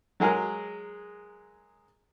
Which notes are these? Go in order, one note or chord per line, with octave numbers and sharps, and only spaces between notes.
F#3 G#3 G#4 A#4